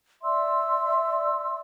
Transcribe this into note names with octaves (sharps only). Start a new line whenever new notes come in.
D5 E5 C6 E6